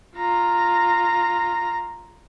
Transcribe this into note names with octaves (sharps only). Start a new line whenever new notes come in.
F4 A#5